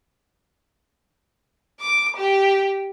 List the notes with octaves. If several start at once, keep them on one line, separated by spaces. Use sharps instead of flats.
D6
G4